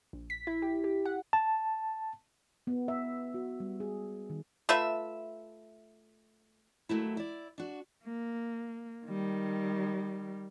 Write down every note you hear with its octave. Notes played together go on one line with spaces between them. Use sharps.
A#1
B6
E4
G4
G4
F#5
A5
B3
E5
F#4
G3
G#4
D#3
A3 F4 B4 E5
D#2 F#3 A3 E4
E4 D5
D4 F#4
A#3
D#3 G3